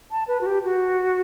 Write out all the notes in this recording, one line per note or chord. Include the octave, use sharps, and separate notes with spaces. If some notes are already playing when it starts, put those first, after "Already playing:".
A5
B4
F#4
G4
F#4